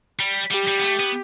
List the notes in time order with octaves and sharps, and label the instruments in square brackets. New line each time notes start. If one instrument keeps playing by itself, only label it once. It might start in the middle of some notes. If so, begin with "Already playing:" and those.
[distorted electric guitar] G3
[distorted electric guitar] G3 [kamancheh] G4
[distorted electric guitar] G3
B3
A3
B3